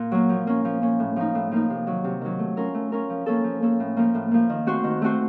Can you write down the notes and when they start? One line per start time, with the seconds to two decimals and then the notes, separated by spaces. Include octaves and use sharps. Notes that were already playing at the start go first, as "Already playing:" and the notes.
Already playing: A#2
0.12 F#3 A#3
0.29 F3
0.47 A#3 C#4
0.65 F3
0.82 A#3 C#4
1.00 A2
1.16 F3 A#3 D#4
1.35 A2
1.52 F3 A#3 D#4
1.70 C3
1.87 D#3 F#3
2.04 C3
2.21 D#3 F#3
2.39 A3
2.57 C#4 F4 A#4
2.74 A3
2.92 C#4 F4 A#4
3.10 F3
3.26 A#3 C#4 A4
3.44 F3
3.62 A#3 C#4 A4
3.80 A2
3.97 F3 A#3
4.15 A2
4.31 F3 A#3
4.49 D#3
4.66 A3 C4 F#4 C5
4.84 D#3
5.02 A3 C4 F#4 C5